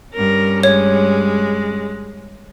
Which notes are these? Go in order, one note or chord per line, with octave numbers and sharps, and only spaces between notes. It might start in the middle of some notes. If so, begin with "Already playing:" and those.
G2 C#4 A#4
G#3 C#5